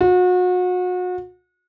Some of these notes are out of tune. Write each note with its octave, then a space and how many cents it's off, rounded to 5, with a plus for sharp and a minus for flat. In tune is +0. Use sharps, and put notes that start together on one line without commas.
F#4 -35